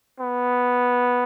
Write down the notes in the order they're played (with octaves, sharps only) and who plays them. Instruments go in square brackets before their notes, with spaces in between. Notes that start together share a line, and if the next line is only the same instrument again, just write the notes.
[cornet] B3